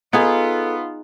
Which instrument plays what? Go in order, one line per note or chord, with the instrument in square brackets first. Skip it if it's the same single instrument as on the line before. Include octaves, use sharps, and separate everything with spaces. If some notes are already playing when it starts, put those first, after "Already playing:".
[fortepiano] B3 [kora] D#4 G#4 [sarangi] F4 [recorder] A4